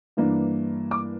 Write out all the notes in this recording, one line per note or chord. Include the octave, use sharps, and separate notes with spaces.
G2 E3 A#3 D4
D6